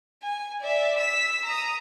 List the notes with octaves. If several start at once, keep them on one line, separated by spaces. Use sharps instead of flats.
G#5
D5 E5
E6 B6
A#5 D#6